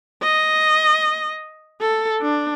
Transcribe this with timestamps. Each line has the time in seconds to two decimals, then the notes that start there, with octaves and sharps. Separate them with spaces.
0.23 D#5
1.81 A4
2.22 D4